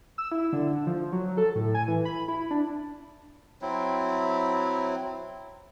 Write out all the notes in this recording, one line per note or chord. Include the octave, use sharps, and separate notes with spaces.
E6
E4
D3
F3
F#3
A4
A2
G#5
E3
B5
E4
D4
F#3 C4 E4